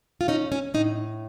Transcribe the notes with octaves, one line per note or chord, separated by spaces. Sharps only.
F4
C#4 D#4
C#4
A2 D#4